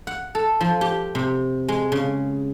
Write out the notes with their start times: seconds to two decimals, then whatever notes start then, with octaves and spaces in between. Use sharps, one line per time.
0.07 F#5
0.35 A4
0.61 F3
0.81 G4
1.15 C3
1.68 G#3
1.92 C#3